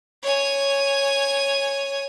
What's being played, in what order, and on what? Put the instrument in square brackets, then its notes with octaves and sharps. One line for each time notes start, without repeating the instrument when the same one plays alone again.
[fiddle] C#5 G#5